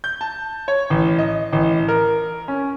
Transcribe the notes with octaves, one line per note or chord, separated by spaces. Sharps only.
G6
A5
C#5
A1
D#5
A1
A#4
C#4